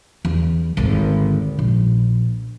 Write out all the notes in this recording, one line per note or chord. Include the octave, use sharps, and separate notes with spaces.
E2
G#1 D2
A#1